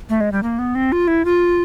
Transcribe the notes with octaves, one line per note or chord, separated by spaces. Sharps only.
A3
G#3
G3
A#3
B3
C4
F4
E4
F4